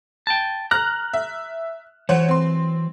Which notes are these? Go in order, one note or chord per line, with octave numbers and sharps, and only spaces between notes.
G5 A5
A#5 F6 F#6
E5
E3 F#3 C5 C#5 F#5
C4 C6